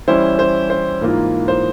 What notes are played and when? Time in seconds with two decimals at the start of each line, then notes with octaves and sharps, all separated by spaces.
0.08 E3 G3 C#4 E4 C5
0.39 C5
0.70 C5
1.01 G#2 E3 A#3 F4
1.48 C5